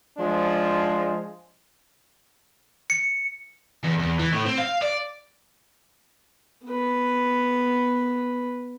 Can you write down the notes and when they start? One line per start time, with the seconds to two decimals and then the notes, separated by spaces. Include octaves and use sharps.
0.18 F3 G#3 D4
2.90 C#7
3.84 E2
3.99 E2
4.19 E3
4.33 A2
4.45 C4
4.58 F5
4.82 D5
6.65 B3 B4